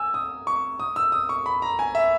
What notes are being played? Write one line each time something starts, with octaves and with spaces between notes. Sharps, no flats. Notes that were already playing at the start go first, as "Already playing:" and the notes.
Already playing: G#5 E6
D#6
C#6
D#6
E6
D#6
C#6
B5
A#5
G#5
E5